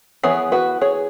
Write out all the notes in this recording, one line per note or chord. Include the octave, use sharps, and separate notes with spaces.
E3 B3 G#4 C#5
F#4 B4
G#4 C#5